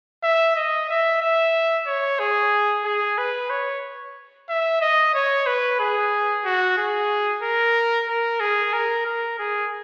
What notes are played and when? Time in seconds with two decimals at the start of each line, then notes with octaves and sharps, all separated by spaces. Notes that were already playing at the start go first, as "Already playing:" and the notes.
0.23 E5
0.56 D#5
0.89 E5
1.21 E5
1.86 C#5
2.19 G#4
2.85 G#4
3.18 B4
3.50 C#5
4.49 E5
4.81 D#5
5.14 C#5
5.46 B4
5.80 G#4
6.45 F#4
6.78 G#4
7.42 A#4
8.08 A#4
8.40 G#4
8.73 A#4
9.06 A#4
9.39 G#4